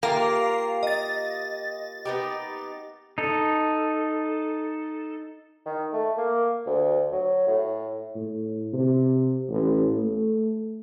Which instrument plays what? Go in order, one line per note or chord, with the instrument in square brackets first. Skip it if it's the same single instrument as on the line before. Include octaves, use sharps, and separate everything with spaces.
[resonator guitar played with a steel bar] A#3 [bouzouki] F4 G4 [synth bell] F5 A#5
[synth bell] D#5 A6
[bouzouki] B3 D#4 G4
[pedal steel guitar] D#4 A4
[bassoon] D#3
A3
A#3
D2
F#3
A2
[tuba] A2
C3
A1
A3